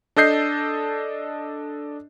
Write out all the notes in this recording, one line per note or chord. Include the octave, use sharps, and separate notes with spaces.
D4 A4 D#5 G6 C7